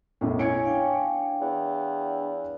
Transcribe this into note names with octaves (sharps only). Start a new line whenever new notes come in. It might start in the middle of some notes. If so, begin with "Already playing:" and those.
B1 F#2 A2
C#4 E4 G#6 C#7 D7
D4 F5 G5
E2